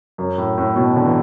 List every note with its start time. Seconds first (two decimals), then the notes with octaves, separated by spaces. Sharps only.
0.18 F#2
0.38 A2
0.58 A2
0.76 B2
0.96 D3
1.05 E3